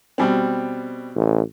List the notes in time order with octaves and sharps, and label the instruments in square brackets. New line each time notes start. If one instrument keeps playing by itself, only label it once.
[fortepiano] B2 G3 C4
[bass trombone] A1